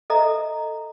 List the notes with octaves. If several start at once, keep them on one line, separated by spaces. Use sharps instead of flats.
A4 D#5 E5 A#5